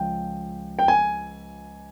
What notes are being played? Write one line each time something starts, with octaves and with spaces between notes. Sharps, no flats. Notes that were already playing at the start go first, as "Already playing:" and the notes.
Already playing: C#2 F3 G5
G5
G#5